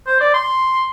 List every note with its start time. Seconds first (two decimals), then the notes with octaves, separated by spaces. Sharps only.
0.07 C5
0.20 D5
0.34 C6